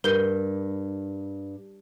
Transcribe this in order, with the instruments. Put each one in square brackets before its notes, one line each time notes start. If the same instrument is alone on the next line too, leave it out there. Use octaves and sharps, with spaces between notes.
[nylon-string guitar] G2 [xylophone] A#4 G6 G7